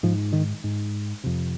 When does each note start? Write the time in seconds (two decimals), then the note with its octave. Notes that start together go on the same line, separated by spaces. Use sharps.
0.03 G#2 F3
0.33 D#3
0.64 G#2
1.24 F2 C3